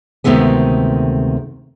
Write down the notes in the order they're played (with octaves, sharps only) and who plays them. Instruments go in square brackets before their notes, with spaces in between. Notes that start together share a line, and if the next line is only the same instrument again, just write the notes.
[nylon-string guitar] D2 C3 D#3 G#3 A3 B3